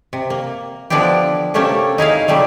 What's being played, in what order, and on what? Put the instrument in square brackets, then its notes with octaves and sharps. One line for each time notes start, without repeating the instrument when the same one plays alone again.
[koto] C3
A#3
D3 F3 B3 D4 E4 G4
C3 A3 A#3 C#4 G4 A4
D#4 E4 G#4 F5
F#3 G3 A3 G4